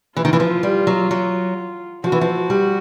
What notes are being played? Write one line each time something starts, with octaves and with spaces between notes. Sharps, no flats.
E3 F4
D#3
E3
F3
G3
F#3
F#3
F3 F#4
E3
F3
G3